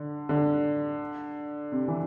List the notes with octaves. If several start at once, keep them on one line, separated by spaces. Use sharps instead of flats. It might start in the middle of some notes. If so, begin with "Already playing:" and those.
Already playing: D3
D3
C3
E3